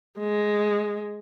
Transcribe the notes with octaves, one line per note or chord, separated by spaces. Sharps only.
G#3